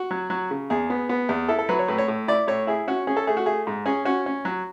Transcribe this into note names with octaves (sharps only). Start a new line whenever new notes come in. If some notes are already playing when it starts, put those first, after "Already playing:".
Already playing: F#4
F#3
F#3
C#3
E2 G#4
B3
B3
E2
E4 A4
A4
F#3 B4
C#5
A2 B4
C#5
A2
E4 D5
A2 C#5
E4 G#4
C#4 F#4
C#4 G#4
A4
A3 G#4
F#4
A3 G#4
G#2
C#4 G#4
C#4 F#4
C#4
F#3